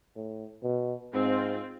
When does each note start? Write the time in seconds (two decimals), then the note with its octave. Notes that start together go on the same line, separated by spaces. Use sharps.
0.16 A2
0.63 B2
1.14 G#2 C4 F4